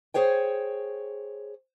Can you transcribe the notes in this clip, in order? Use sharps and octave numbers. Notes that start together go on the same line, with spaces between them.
G#4 C5 C#5 G5